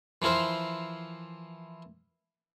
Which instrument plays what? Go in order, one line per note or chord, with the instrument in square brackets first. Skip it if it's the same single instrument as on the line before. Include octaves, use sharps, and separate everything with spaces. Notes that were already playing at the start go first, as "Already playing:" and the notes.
[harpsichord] E3 F3 E4 A#4 C5